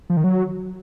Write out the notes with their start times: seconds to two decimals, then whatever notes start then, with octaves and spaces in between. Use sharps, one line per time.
0.10 F3
0.17 D#3
0.24 F#3